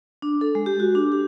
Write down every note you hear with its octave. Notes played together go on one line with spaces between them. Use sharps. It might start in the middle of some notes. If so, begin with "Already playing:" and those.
D4
A4
G#3
G4
F#4
D4
G4